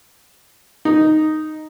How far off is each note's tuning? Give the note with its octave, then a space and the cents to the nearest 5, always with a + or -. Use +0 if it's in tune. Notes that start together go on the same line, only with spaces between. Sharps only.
D#4 -5